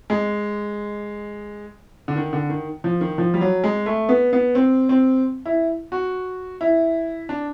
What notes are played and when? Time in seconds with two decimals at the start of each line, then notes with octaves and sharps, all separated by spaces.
0.10 G#3
2.08 D3
2.16 D#3
2.33 D3
2.49 D#3
2.84 F3
3.01 D#3
3.18 F3
3.34 G3
3.41 F#3
3.64 G#3
3.86 A3
4.09 B3
4.33 B3
4.55 C4
4.89 C4
5.46 E4
5.92 F#4
6.61 E4
7.29 D4